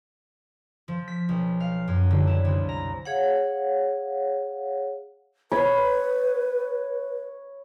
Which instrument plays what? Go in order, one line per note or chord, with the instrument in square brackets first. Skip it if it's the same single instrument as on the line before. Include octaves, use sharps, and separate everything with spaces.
[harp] F3
B6
B1
F5
F#2
D3
E4
C2
A#5
[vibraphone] G#4 C#5 F5 F#5
[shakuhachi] B4 [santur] C#5 B5